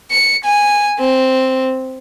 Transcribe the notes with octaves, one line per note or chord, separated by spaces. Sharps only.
C#7
G#5
C4